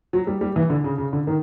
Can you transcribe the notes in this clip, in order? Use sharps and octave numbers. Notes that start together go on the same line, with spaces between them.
F#3
G3
G3
E3
D3
C#3
C#3
D3
D#3